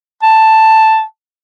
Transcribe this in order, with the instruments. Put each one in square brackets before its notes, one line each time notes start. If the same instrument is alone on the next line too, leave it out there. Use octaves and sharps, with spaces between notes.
[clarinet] A5